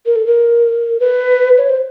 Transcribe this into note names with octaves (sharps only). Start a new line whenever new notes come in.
A#4
A4
A#4
B4
C#5
C5